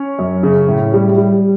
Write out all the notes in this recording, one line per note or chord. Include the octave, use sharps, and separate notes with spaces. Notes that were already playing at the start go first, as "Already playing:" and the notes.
Already playing: C#4 C#5
F#2
C#3
A2
G3
G3